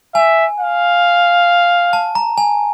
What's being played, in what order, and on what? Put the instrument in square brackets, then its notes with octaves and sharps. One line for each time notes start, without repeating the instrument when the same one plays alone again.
[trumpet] E5 [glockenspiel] G#5
[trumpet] F5
[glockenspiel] A5
A#5
G#5